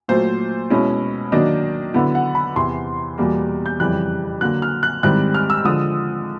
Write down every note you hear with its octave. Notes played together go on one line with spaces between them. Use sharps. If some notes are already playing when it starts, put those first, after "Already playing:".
A#2 F#3 A3 C5
B2 G#3 C#4 E4
D#3 F#3 A#3 D4 D#5
D3 F#3 B3 E4
F#5
B5
E2 C3 E3 C6
E2 B2 G3 A#3
G6
F2 C#3 E3 G3 F#6
D3 F#3 A#3 F#6
F6
F#6
G#2 D#3 G3 C4 E4 F#6
F6
E6
D3 F3 G#3 D#6